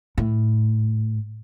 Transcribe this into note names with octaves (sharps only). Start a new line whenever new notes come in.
A2